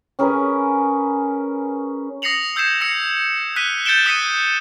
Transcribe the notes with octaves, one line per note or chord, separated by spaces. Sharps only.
C#4 G#4 A#4 B4
D#6 A#6 C7 C#7 F7 F#7
E6 G6 G#6 C7 E7
E6 A#6 C#7
F#6 B6 D#7 G7
G6 A6 C#7 D7 E7 G7
D#6 B6 C#7 D#7